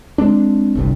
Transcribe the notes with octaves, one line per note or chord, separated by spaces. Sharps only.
G#3 C4 D4
G1 C2 G2